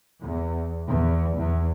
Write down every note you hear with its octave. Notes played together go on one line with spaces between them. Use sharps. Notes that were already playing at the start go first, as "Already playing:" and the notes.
E2
E2
E2